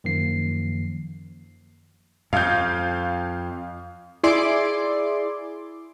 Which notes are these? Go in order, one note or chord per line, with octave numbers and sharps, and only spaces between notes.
F#2 D#3 F3 A#3 C7
F2 F5 G6
E4 G#4 D5 C6 D6